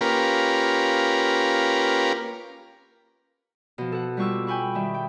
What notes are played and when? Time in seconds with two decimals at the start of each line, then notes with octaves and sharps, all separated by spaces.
0.01 A#3 C#4 F4 G4 A#4 B4
3.78 B2 F3
3.92 A4 F#5
4.17 G3 B3 F4 C#6 D6 E6
4.47 G5 G#5 B5 C#6
4.75 D#3 G3 E5
4.94 G5